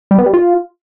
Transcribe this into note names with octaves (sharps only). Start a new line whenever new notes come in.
G3
B3
G3
F4